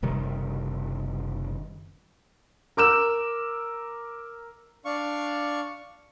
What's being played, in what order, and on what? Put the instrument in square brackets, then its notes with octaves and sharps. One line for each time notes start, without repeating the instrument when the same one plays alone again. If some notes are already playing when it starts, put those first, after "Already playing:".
[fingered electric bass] F#1 C3 D#3 G3
[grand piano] A#4 D6 E6 E7
[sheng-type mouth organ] D4 F5 C#6